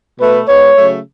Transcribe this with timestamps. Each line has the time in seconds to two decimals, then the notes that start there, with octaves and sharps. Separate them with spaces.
0.19 B2 A3 B4
0.48 G#2 G#3 B3 C#5
0.77 C#3 F#3 A3